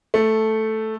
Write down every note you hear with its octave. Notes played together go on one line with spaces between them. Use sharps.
A3